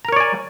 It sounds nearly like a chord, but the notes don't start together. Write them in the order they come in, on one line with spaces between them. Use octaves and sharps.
A#5 A#4 C#5 D5 G#5